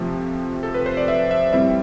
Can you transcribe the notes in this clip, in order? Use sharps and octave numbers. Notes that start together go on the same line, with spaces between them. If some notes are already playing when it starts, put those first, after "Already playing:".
Already playing: C3 F3 A3
A4
B4
C5
D5
E5
E5
A2 G3 C4 E4 E5